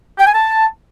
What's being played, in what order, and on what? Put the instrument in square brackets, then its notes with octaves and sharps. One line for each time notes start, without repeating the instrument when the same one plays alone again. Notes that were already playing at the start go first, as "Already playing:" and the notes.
[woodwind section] G5
G#5
A5